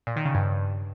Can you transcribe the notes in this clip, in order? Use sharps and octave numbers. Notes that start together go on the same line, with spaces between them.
A#2
D#3
C#3
G2